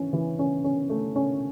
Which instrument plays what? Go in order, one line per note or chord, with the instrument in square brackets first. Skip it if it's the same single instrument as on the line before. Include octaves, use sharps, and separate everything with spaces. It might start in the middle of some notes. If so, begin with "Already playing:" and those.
Already playing: [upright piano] E3 C#4
E3
C#4
C#4
A3
C#4